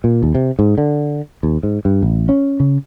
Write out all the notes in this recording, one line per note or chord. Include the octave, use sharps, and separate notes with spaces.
A#2
D#2
C3
G#2
D3
D#2
G#2
G2
A1
C#4
C#3